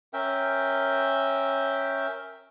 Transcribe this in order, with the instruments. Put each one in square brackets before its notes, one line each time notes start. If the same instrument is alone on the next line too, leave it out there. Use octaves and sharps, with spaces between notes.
[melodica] C#4 A#4 E5 G5